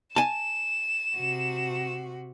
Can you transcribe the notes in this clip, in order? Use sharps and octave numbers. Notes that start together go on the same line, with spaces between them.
G#5 A5 E7
C3 F#4